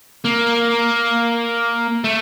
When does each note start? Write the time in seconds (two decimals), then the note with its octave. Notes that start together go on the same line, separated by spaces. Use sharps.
0.25 A#3
2.04 A3